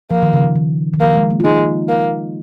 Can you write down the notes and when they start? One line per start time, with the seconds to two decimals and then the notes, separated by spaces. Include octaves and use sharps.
0.11 F3 A#3
0.22 D#3
0.33 C#3
0.44 C#3
0.56 D#3
0.94 D#3
1.00 F3 A#3
1.15 G#3
1.30 A#3
1.40 F4
1.44 G#3 D#4
1.89 A#3